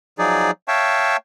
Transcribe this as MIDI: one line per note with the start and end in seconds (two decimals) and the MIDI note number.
0.19 0.51 53
0.19 0.51 54
0.19 0.51 63
0.19 0.51 68
0.19 0.51 74
0.68 1.17 73
0.68 1.17 76
0.68 1.17 77
0.68 1.17 79
0.68 1.17 81
0.68 1.17 85